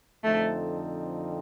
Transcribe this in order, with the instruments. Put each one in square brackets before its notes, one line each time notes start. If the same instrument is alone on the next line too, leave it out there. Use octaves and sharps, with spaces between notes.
[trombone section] F2 D3 F3 C4 D#4 [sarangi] A3